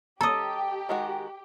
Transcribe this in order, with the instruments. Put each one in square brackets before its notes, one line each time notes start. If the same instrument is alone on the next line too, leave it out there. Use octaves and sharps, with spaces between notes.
[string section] G4 [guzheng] A4 D#5 [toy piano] A#5 D#6
[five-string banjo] D#3 G#3 F#4